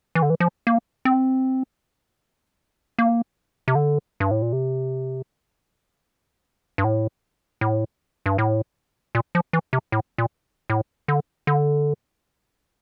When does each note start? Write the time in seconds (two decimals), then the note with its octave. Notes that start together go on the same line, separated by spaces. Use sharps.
0.15 E3
0.22 D3
0.30 E3
0.40 F3
0.67 A#3
1.05 C4
2.99 A#3
3.68 C3
3.75 D3
4.20 G2
4.31 A2
4.42 A#2
4.53 C3
6.78 G2
6.84 A2
7.61 A2
8.26 G2
8.38 A2
9.15 A#2
9.35 F3
9.53 E3
9.73 C3
9.92 A2
10.18 A#2
10.70 A2
11.08 D3
11.47 D3